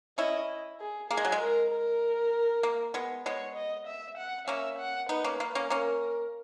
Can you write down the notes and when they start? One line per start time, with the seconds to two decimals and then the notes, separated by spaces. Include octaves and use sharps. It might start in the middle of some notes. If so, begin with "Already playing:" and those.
0.18 C#4 E4 D#5
0.80 G#4
1.10 A#3 G#4
1.17 G#3
1.25 F#3
1.32 G#3
1.41 A#4
1.72 A#4
2.63 A#3
2.94 G#3 B3
3.26 G#3 B3 C#5
3.56 D#5
3.87 E5
4.17 F#5
4.48 A#3 C#4 E5
4.79 F#5
5.09 B3 D#4 B4
5.24 A#3 C#4
5.40 A#3
5.55 A#3 C#4
5.70 A#3 C#4 A#4